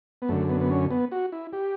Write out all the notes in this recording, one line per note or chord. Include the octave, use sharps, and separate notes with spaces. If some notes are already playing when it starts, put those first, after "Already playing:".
B3
F#2 D3 A3
B3
B3
C#4
B3
F#4
E4
G4